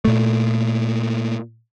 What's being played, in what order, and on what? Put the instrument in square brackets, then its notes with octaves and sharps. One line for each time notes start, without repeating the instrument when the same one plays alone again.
[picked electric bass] A#2 A3